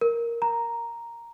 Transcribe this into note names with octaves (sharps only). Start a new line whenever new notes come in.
A#4
A#5